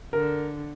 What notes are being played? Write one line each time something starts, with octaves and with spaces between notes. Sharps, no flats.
D3 A#4